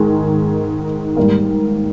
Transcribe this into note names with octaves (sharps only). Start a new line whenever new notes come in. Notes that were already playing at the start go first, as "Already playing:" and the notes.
Already playing: G#2 D#3 G#3
G#2 G3 A#3